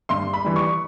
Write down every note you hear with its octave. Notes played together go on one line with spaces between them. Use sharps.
G2 C6
B5
E3 G3
C#6